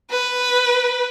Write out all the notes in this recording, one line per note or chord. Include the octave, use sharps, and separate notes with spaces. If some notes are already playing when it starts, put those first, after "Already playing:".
B4